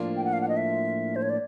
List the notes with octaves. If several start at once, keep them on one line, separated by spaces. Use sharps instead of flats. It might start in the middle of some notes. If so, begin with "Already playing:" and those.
Already playing: A2 F3 A#3 D4 F4
G5
F#5
F5
F#5
D#5
E5
C5
C#5
D5